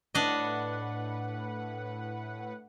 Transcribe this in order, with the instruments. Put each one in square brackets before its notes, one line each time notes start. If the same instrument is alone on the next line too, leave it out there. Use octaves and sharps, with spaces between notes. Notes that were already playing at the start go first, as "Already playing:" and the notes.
[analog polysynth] A2 B4 F#5 [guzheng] D4 D#5